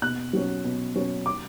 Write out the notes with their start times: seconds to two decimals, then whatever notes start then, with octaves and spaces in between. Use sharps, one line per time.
0.02 B2 F#6
0.33 F#3 C#4
0.64 B2
0.95 F#3 C#4
1.26 D6